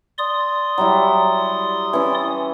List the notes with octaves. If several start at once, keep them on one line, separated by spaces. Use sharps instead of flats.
D5 C6 D#6
F#3 G3 E4
E3 C#4